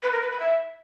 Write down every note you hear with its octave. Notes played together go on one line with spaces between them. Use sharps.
B4
A#4
B4
B5
E5